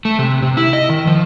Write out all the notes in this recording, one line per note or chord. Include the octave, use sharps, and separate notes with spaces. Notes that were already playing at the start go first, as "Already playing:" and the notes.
A3
C3
C3
E4
D#5
D#3
F3